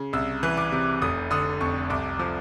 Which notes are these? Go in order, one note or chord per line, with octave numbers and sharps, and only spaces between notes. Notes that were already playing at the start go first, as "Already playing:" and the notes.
Already playing: C#3
C2 E6
E3
D6
C3
F1 D#6
D3 D#6
F2 C#6
C2 D6
F3